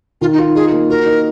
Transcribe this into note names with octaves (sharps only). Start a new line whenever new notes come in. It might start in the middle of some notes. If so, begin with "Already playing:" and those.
D#3 F4
D#4
F4
D#4 G#4
A#3
F#4 A#4
D#4